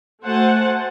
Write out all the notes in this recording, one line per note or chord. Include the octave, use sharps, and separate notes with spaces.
A3 F#4 C5 F#5 G#5 A5